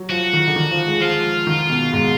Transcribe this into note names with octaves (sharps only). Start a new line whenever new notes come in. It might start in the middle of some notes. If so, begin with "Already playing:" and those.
Already playing: F#3
F3 F#4
D#3
D3
D#3
F3
G#3
F3 F4
D#3
B2
G#2